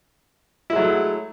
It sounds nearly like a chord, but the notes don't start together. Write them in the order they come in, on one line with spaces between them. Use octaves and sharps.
E4 G#3 F#3 A3